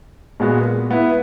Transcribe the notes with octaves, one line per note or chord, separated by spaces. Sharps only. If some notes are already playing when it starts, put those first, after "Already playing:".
A#2 G#3 B3 F#4
B3 E4 B4